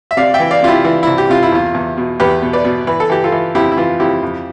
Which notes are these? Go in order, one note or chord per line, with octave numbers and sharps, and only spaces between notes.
E5
C3 D5 F5
E5 G5
E3
D5 F5
C3 F4
E4 G4
E3 E4
C2 E4
G4
C3 F4
E4
E2 F4
E2
B2
E2 G4 B4
B2
B4 D5
B2
E3 B4
A4
E3 G4
F4 A4
E3
F2 E4 G4
E4
E3 F4
F2 E4 G4
F2